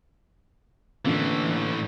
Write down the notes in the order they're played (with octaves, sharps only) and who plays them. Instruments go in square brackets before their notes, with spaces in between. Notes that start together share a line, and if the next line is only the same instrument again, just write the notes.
[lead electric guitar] A2 E3 [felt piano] D3 A#3 F4